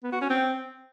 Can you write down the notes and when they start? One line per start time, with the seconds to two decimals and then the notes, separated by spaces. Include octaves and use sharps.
0.03 B3
0.12 F#4
0.21 C#4
0.30 C4